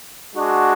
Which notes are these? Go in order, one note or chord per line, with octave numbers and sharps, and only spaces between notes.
G#3 D4 F#4